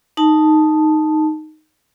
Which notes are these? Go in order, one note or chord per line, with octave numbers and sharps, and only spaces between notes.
D#4 A5